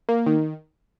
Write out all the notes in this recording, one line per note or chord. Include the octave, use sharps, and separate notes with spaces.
A#3
D#3